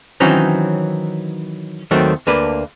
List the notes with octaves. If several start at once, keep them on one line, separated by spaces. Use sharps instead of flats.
D#3 E3 F#3 C4 C#4 D#4
D#2 D#3 F#3 A3 C4
D2 D3 A#3 B4